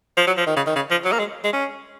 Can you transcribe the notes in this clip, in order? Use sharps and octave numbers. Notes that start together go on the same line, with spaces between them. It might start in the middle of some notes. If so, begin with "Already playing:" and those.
F3
F#3
F3
D#3
C#3
D#3
C#3
F3
F#3
A#3
G#3
G#3
C#4